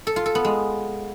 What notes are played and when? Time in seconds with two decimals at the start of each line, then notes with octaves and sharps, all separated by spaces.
0.07 A4
0.16 F4
0.26 A4
0.35 B3
0.45 G#3